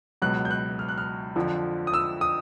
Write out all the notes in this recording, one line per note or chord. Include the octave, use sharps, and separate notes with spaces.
C#2 B2 F#3 F#6
G6
F#6
F6
F#6
F6
F2 D3 F3
D#6
E6
D#6